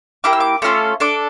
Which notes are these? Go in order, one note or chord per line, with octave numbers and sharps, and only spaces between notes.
A#3 E4 G4 D6
E6
D6
A3 C#4 F4 A4
D4 A4 D6